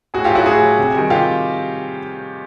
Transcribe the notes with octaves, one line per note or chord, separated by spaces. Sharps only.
A2 F#4 G#4
F4 G4
F#3
E4 F#4
A2 F#4 G#4
F#3
C3
D#3 G3
C3 F4 G4